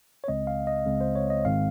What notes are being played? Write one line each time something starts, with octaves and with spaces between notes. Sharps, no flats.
C#5
C#2 C#3 G#3 C4 D#5
F5
D#5
C#2 C#3 G#3 C4
C5
C#5
D#5
G#1 G#2 D#3 G#3 C4 F5